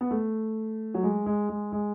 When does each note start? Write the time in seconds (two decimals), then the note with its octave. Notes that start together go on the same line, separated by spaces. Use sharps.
0.01 B3
0.11 A3
0.94 F#3
1.03 G#3
1.26 G#3
1.49 G#3
1.72 G#3